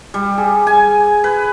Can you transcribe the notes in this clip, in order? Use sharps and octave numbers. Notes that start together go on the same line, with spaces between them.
G3
G#4
G#5
B4